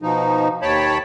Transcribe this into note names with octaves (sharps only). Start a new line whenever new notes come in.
B2 F3 D#4
D#2 C#5 G5 A5 B5